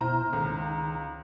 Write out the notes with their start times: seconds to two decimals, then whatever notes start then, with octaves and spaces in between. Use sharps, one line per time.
0.01 B2 E4 C5 A#5 F6
0.33 C#2 D#3 A#5